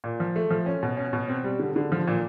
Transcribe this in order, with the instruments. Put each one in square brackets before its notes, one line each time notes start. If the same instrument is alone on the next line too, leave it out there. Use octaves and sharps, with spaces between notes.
[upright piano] A#2
F3
A3
F3
C#4
B2
C#4
B2
C4
G3
D3
D3
F3
A#2